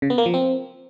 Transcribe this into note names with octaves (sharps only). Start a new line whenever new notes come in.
C#3
B3
A#3
F3
C4